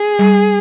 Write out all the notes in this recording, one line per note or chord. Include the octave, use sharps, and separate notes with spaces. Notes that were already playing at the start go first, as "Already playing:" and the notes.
Already playing: G#4
G3